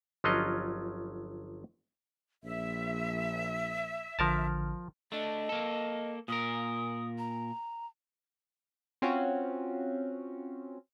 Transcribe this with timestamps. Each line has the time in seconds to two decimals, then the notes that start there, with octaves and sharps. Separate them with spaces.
0.24 G1 F3 F#3 C#4 F4 D#5
2.44 A#1 E5
4.19 A1 D3 F3 A#4 A5 F6
5.12 A3 D4 D#5
5.49 A#3 A4
6.28 A#2 A#4 D#6
7.18 A#5
9.02 C4 C#4 F4 F#4